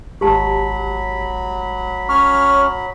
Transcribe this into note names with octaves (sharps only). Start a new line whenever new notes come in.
G#1 F#3 G#3 G4 A5 B5
C#4 C#5 C#6 F6